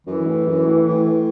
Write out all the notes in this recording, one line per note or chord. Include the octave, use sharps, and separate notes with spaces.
F#2 E3
A2
F#2
A2
A2